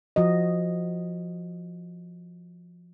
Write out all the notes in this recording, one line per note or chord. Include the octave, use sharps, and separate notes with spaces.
F3 F#4 D#5